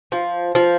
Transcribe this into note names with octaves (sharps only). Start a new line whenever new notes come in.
F3
F3